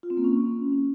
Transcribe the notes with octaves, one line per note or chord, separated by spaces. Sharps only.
F4
C4
A#3
C#4